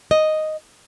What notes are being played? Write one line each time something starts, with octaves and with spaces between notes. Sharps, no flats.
D#5